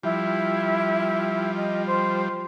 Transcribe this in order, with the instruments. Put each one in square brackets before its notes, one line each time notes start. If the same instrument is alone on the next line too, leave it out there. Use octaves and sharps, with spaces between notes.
[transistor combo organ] F3 G3 [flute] E4
[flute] D#5
C5